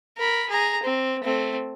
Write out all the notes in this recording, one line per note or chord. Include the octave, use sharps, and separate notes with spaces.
A#4 B5
G#4 A#5
C4
A3 C4